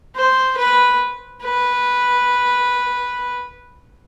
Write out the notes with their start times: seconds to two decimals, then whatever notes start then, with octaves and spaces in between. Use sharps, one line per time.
0.16 C5
0.58 B4
1.43 B4